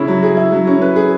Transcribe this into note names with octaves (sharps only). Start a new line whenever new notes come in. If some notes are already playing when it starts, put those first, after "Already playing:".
Already playing: C#3 C#4 E4
F#3
G#4
E4
F#3
C#4
B4
G#4